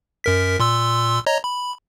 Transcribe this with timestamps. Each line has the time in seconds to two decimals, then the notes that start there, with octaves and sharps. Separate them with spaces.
0.24 F#2 A#4 B6
0.60 A#2 C6 E6
1.26 C#5 D#5 A#5
1.44 B5